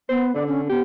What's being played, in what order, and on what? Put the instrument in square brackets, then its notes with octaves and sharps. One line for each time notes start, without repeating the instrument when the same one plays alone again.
[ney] B3 [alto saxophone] C5
[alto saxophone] D3 [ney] D5
[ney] C#4
[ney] B3 [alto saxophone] G4